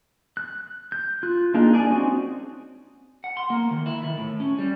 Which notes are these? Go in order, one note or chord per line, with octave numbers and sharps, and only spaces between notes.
F#6
G6
F4 F#6
A#3 D4 D#4 F4 G#4
G#4 D5 G#5
C4 C#4 D#4 F#4
F#5
C6
A#3
D#3
E4
D#3
A2
C#4
G3